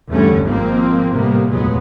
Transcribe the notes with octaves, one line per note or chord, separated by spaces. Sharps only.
E2 G2 D3 G3 A3 C#4
G#1 F3 G#3 A#3 C4
A2 C3 G3 A#3 B3
F1 D#2 A#2 F#3 G#3 B3